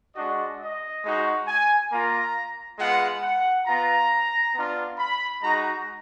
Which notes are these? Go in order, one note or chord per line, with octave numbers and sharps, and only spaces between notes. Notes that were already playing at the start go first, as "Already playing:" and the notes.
G#3 D4 F#4 D#5
D#5
G#3 D#4 F#4
G#5
A#3 F4 A#5
G#3 B3 F4 F#5
F#5
B3 F4 A#5
B3 D4 F4
B5
G#3 D#4 F#4 A#5